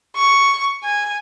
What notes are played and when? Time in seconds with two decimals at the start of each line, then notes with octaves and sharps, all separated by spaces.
0.16 C#6
0.84 G#5